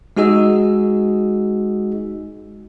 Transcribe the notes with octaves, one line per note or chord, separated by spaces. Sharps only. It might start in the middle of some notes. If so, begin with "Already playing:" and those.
G#3 D#4 F#4 G#4 D#5 E6